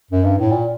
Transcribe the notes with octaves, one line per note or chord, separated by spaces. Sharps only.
F#2
G2
A2
A#2